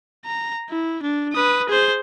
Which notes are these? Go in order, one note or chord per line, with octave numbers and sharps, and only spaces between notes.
A#5
E4
D4
B4 D#6
G#4 C5